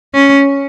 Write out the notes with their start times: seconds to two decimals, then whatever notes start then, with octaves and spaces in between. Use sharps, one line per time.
0.14 C#4